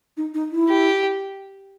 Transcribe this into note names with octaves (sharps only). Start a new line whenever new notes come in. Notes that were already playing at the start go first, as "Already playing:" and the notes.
D#4
D#4
E4
G4